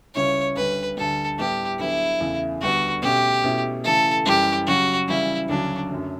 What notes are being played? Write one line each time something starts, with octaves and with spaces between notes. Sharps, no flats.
C#2 C#3 G3 C#4 E4 C#5
D2 D3 G3 B4
D2 D3 G3 A4
A2 G3 B3 E4 G4
D2 D3 F#3 B3 E4
E2 C#3 E3 A3
D2 D3 G3 B3 D4 F#4
B2 A3 C#4 G4
B2 A3 C#4 E4
C#3 E3 A3 A4
F#2 E3 G3 G4
C#3 F#3 C#4 F#4
C#3 E3 G3 E4
D2 C#3 F#3 C#4 D4
F#2 D3 F#3 A3